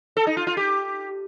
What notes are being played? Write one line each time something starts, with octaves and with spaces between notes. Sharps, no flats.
A4
D#4
F4
F4
G4